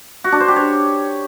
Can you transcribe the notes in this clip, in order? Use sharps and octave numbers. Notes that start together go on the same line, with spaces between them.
F#4
D4
C5
G4
C#5